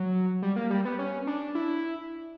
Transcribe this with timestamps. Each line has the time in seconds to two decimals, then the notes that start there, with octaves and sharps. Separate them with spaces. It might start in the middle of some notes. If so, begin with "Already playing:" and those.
Already playing: F#3
0.42 G3
0.56 A#3
0.70 G3
0.85 B3
0.99 C#4
1.27 D4
1.55 E4